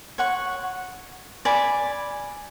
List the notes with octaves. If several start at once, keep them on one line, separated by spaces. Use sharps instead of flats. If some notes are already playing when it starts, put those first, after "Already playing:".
C#5 F#5 C#6
D5 G#5 B5